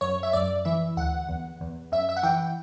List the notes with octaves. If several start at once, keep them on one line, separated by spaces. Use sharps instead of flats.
F#2 C#5
E5
F#2 D5
E3 E5
D2 F#5
E2
E2
F#2 E5
E5
F#5
E3 G5